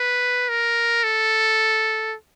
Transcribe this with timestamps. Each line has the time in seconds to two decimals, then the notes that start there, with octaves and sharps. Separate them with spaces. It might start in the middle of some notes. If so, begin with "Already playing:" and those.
Already playing: B4
0.49 A#4
1.03 A4